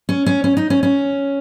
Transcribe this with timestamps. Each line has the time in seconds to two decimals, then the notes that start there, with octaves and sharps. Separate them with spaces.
0.09 C#4
0.26 C#4
0.44 C#4
0.57 D#4
0.70 C#4
0.83 C#4